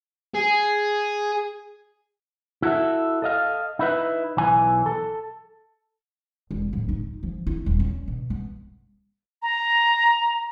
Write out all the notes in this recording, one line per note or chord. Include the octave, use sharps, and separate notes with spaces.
G#4
E4 F#4 A4 E5
A4 D#5 F5
D#4 E4 B4
B1 E3 G#5
A4
E1
D1
D#4
F3
E4
D#1
C#4
B2
B3
A#5